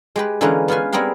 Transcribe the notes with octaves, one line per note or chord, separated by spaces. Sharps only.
G#3 G4 B4
D3 E3 G#3 A#3 C#4 B4
B3 C#4 F4 B4 G#5
G3 B3 C4 G#4 A#4 F5